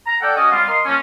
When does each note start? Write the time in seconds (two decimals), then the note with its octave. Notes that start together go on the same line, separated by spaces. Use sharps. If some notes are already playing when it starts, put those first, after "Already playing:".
0.07 A#5
0.21 A4 D5 F#5 G5
0.36 C#4 F#4 D#5
0.52 G3 C4 F4 F5
0.67 A#4 D#5 C6
0.86 F3 A#3 C#4